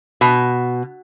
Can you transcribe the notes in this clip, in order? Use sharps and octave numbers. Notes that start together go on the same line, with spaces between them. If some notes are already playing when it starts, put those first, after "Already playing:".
B2